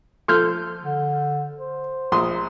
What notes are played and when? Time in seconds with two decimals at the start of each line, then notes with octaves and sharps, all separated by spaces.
0.28 F3 A4 C6 F6 G6
0.83 D3
1.59 C5
2.12 A#1 C6 D#6